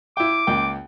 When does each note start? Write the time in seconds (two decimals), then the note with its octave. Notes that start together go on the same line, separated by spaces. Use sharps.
0.17 E4 G5 D6
0.47 C#2 A#3 G5